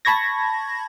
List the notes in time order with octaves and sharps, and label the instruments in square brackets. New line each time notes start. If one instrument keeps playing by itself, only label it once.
[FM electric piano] A5 B5 C#6 G#6 A#6